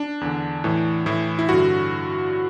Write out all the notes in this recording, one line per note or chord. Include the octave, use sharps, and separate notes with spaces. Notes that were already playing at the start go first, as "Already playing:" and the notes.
Already playing: D4
E2 D3
A2 E3
A2 E3 E4
E4
G2 D3 F#4